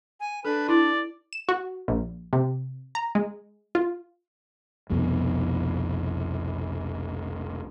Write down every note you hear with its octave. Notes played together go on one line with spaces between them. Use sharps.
G#5
D4 A4 B4
E4 D5
E7
F#4
A#1
C3
A#5
G#3
F4
F1 C2 F2 B2